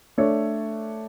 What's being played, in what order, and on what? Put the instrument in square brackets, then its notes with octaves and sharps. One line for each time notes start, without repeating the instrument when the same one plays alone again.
[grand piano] A3 D4 A4 C#5